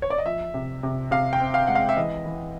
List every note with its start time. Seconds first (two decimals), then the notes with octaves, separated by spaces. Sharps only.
0.02 C#5
0.10 D5
0.18 D#5
0.26 F3 E5
0.54 C3
0.83 C3
1.11 C3 F5
1.33 G5
1.40 C4
1.54 F5
1.67 G#3 F#5
1.75 F5
1.89 E5
1.97 E3 D#5
2.26 E3